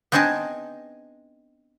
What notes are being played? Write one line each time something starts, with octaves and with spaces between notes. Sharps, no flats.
B3 C4 D4 D#4 G#4 A5